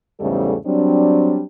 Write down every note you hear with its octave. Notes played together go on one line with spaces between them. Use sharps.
E2 G#2 C#3 G3 A3 A4
F#3 G3 C4 D4